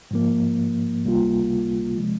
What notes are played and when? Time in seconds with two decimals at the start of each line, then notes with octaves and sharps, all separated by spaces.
0.11 G#2 F3 A#3
1.04 C#2 C3 G3 A#3 F4
1.97 C3 F3 G#3